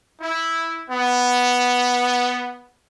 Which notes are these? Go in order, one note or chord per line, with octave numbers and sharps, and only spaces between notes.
E4
B3